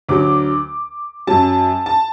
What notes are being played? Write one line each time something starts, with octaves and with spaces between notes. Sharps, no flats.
D2 D3 F#3 D6
F#2 F#3 A5
A5